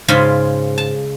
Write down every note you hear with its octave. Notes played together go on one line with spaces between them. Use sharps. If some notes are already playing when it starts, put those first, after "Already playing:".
G#2 C#3 F4 B5
A5